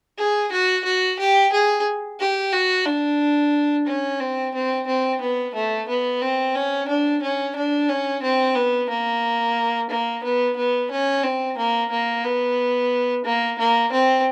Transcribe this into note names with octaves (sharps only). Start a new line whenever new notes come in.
G#4
F#4
F#4
G4
G#4
G4
F#4
D4
C#4
C4
C4
C4
B3
A3
B3
C4
C#4
D4
C#4
D4
C#4
C4
B3
A#3
A#3
B3
B3
C#4
C4
A#3
A#3
B3
A#3
A#3
C4